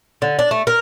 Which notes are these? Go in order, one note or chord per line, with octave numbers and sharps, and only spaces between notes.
D3
D4
A3
A#4